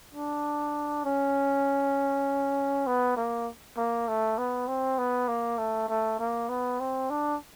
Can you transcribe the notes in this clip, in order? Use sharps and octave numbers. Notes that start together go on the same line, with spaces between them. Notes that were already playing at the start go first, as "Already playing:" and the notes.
D4
C#4
B3
A#3
A#3
A3
B3
C4
B3
A#3
A3
A3
A#3
B3
C4
D4